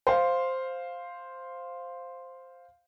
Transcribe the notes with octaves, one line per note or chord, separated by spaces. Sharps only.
C5 F5